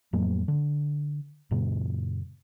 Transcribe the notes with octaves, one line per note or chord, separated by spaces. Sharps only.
F2 A2 F#3 A#3
D3
F#2 A#2 C#3